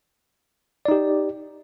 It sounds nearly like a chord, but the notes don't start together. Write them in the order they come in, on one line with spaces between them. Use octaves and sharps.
D5 D#4 G4